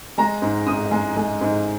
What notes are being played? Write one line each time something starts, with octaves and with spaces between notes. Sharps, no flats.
G#3 A#5
G#2
G#2 D#6
G#3
G#3
G#2